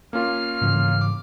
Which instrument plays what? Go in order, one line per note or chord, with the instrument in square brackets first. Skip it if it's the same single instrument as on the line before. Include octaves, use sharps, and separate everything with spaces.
[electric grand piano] A#3 C#4 F4 [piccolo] F6
[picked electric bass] G#2 C#3 E3
[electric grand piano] D6